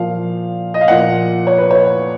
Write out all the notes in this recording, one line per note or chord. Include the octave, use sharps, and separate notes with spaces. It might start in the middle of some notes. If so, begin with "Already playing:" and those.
Already playing: A#2 F3 F5
D#5
F5
A#2 F3 F#5
C#5
B4
C#5